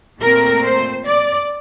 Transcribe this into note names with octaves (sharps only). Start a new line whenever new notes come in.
A#2 A3 C4 A#4
C5
D5